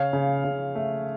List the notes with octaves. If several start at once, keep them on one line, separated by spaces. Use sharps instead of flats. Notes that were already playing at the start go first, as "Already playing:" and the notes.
Already playing: C#3 C#5 F5
C#3
C#3
A3